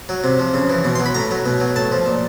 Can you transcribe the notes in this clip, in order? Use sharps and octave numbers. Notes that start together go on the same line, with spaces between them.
F#3
C3
F3
C#3
E3
B2
C6
F#3
B5
A2 A#5
F#3
B2
F#3
A2 A5
F3
A#2